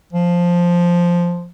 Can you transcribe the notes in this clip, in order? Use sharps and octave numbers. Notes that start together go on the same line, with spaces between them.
F3